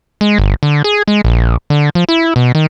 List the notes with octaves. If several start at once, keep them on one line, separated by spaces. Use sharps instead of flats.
G#3
G1
D3
G#4
G#3
A#1
D3
F3
E4
B2
D#3